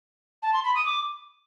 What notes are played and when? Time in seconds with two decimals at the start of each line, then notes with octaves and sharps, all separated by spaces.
0.42 A5
0.53 C6
0.64 B5
0.75 D#6
0.86 D6